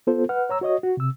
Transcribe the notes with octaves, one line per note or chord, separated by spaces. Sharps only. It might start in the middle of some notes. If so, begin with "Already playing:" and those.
B3 F4 A4 C5
B4 F#5 F6
C#5 A#5 E6
F#4 C#5 D#5 D#6
F#4
C3 E6